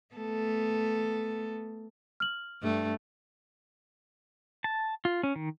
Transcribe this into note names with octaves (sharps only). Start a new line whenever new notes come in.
A3 B3 A4
F6 F#7
G2 A3
A5
F4
C#4
D#3